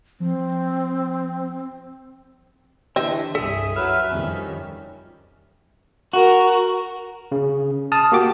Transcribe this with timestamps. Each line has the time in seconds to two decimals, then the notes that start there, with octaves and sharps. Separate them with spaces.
0.20 F3 C4
2.96 D3 E3 G4 D#5 E5
3.35 C2 G2 G#4 A4 E5
3.76 F#2 F#3 B4 E5 F6
4.11 F2 D#3 G3 C#4
6.13 F#4 A#4
7.32 C#3
7.92 A5 D#6 F6
8.12 A#3 F#4 G4 D6